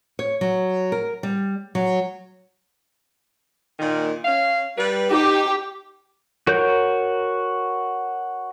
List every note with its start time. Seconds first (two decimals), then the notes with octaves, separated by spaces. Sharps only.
0.19 C#5
0.41 F#3
0.92 A#4
1.23 G3
1.75 F#3
3.79 A#2 D#3
4.25 C#4 F5
4.77 G3 B4
5.11 D#4 G4
6.47 F#4 A#4 C#5 G6